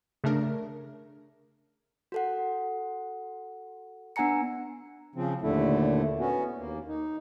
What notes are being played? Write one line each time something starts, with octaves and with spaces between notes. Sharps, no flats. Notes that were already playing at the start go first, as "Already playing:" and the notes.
C#3 A3 D4 A#4
F#4 A4 F#5
B3 D4 F#5 G#5 A#5 C#7
C#3 F3 C4
D#2 A#2 D3 A3 E4
B3 C#4 F#4
D#2 A#3
D#4